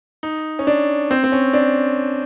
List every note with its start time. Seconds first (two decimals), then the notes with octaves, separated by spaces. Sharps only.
0.23 D#4
0.59 C#4
0.67 D4
1.11 C4
1.24 C4
1.32 C#4
1.53 D4